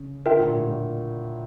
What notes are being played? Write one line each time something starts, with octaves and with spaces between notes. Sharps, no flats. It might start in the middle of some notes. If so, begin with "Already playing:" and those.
Already playing: C#3
D3 F4 A#4 E5 G5
A#2
A2
A2